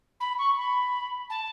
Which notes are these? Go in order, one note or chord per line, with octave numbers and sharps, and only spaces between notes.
B5
C#6
B5
A5